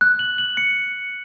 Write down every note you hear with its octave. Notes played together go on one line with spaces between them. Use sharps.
F#6
F#7
F#7
C#7